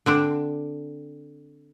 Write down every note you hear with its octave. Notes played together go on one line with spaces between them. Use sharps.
D3 C4 D4